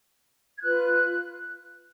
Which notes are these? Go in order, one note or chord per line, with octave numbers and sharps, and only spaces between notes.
G#6
F4 B4 F#6